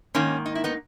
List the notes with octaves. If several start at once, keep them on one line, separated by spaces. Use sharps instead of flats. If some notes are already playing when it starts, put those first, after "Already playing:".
G#2 D#3 A#3 C#4
D#4
E4
B3 D#4